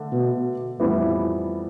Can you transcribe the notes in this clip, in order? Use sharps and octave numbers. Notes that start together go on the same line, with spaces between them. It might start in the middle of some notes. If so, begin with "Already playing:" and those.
Already playing: D3 A3
B2
F2 A2 E3 G3 B3 E4